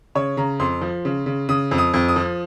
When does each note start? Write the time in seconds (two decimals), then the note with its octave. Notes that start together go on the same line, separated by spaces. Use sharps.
0.15 C#3 C#5
0.37 C#3 A#5
0.60 F2 C6
0.81 F3
1.05 C#3
1.26 C#3
1.49 C#3 D#6
1.71 F2
1.78 D#6
1.94 F2
2.08 D#6
2.16 F3